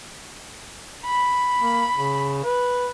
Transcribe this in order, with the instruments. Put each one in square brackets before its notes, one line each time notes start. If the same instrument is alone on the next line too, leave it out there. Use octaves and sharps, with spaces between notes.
[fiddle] B5
[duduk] A#3
C#3
B4